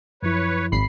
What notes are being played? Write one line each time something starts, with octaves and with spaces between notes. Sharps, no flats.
F#2 F3 E4 B4 C#5
G#1 B5 C7